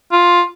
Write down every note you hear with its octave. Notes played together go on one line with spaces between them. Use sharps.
F4